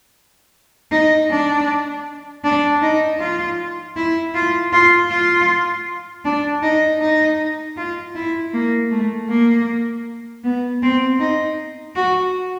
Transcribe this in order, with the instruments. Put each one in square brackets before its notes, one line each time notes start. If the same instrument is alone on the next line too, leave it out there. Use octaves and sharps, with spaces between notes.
[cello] D#4
D4
D4
D#4
F4
E4
F4
F4
F4
D4
D#4
D#4
F4
E4
A#3
A3
A#3
B3
C4
D#4
F#4